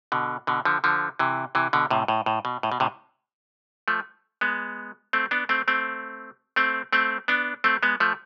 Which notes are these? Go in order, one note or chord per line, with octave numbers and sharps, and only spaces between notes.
B2 D3
B2 D3
D3 F3
D3 F3
C3 E3
C3 E3
B2 D3
A2 C3
A2
A2
B2
A2
B2
A2 C3
F3 A3
G#3 B3
A3 C4
B3 D4
A3 C4
A3 C4
A3 C4
A3 C4
B3 D4
A3 C4
G#3 B3
F3 A3